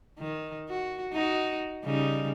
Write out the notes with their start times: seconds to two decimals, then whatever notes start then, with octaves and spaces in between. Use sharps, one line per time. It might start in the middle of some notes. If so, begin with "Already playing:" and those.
0.19 D#3
0.69 F#4
1.13 D#4 F#4
1.84 C#3 G3 D#4